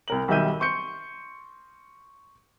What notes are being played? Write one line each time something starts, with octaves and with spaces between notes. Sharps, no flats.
C2 A#4 F#7
B1 D#3 G3 E5 G6 D#7
C6 C#6 G6 C#7